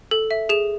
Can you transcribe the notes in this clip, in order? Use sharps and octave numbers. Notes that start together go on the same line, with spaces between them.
A4
E5
G#4 E7